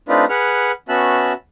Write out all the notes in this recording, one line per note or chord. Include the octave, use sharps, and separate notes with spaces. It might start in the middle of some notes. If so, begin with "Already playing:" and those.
A3 C4 D4 D#4 F4 B4
G#4 B4 F#5 F6
B3 C#4 F#4 E5 A5 F#6